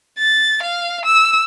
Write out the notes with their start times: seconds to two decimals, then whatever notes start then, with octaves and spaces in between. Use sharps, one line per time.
0.18 A6
0.63 F5
1.05 E6